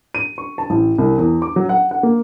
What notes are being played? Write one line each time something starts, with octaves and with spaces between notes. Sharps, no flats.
D#7
C#6
A5
A1
C2
E2
D6
F#3
F#5
F#5
A#3